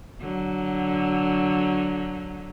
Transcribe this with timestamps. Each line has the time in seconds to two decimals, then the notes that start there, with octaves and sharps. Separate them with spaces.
0.21 D3 F#3